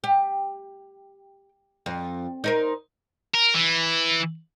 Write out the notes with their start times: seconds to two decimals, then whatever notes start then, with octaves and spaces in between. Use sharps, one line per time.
0.04 G4
1.86 F2
2.44 D#4 A#4 C5
3.34 A#4
3.54 E3